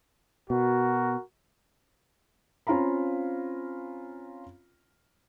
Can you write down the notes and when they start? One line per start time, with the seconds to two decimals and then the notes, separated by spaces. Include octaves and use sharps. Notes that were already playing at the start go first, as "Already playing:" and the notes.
0.50 B2 F#4 A#4
2.67 C4 C#4 F4 F5 A#5 B5